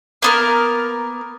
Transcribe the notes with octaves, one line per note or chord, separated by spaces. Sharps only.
A#3 B3 A#4